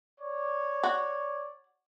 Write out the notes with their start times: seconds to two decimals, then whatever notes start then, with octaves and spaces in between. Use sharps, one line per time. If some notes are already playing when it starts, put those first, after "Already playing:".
0.19 C#5 D5
0.83 F#4